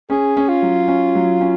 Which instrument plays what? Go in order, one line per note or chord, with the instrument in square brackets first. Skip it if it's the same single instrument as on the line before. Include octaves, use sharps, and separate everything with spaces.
[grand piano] C#4 [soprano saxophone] G#4
[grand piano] C#4
[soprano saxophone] F4
[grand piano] F#3
C#4
F#3
C#4